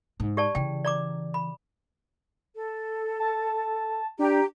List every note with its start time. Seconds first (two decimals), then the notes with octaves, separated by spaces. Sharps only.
0.20 G#2
0.37 G4 D5 A5
0.55 C#3 E3 G5
0.85 D5 A#5 D6
1.34 B5
2.54 A4
3.20 A5
4.19 D4 G4 A#5